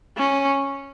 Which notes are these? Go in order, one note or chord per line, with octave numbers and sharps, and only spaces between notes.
C#4